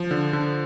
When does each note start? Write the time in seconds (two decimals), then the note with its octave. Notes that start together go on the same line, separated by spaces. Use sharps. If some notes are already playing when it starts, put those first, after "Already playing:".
Already playing: F3
0.11 D3
0.33 D3